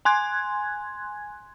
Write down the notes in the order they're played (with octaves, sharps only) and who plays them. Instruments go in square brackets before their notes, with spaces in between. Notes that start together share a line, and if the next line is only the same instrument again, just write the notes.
[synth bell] G#5 C6 F#6 G#6